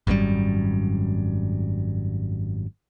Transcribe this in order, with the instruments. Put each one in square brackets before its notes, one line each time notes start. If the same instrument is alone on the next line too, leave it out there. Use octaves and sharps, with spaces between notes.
[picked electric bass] G#1 F#2 A2 G3